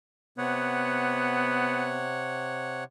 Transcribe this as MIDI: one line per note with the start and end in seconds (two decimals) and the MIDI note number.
0.38 2.84 48
0.38 2.10 59
0.38 2.84 73
0.38 2.84 78